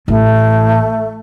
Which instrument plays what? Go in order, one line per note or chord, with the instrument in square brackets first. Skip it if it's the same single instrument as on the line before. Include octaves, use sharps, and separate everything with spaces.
[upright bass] A1 [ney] A3